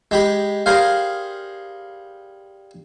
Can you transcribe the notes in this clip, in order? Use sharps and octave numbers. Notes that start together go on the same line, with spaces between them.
G#3 G4 B5
G3 G#4 A#4 C5 F5